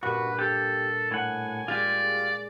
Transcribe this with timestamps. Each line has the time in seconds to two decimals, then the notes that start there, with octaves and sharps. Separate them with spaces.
0.03 G2 A#2 F#4 B4
0.39 G4 A4
1.11 A2 F#5 G#5
1.68 G#3 F4 G4 D5